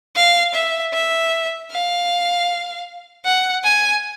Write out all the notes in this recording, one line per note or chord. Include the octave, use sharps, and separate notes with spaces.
F5
E5
E5
F5
F#5
G#5